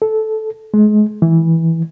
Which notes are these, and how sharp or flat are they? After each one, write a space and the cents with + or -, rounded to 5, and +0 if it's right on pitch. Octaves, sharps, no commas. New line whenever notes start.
A4 -10
G#3 +30
E3 -10